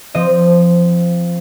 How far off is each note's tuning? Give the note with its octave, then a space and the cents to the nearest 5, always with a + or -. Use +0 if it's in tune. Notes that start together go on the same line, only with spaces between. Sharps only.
F3 -15 C4 +0 D#5 -10